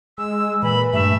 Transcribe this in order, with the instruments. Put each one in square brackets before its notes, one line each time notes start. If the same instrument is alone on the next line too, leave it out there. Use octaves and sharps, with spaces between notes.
[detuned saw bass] G#3 [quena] E6
[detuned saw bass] A#2 [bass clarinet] E3 [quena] B5
[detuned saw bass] G2 [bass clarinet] A3 [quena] E5